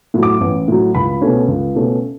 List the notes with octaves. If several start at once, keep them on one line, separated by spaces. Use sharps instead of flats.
A2 F#3
D6
A1
A2 F#3
C#2 B5
B2 A3 C#4
C#2
B2 A3 C#4